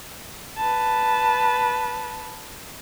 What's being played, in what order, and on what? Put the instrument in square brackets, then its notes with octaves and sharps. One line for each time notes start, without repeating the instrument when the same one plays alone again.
[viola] B4 A5